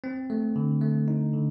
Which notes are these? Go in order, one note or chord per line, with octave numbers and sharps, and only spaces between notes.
C4
A3
D3
A3
D#4
D3